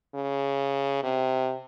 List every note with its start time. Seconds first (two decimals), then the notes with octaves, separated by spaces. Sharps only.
0.15 C#3
1.03 C3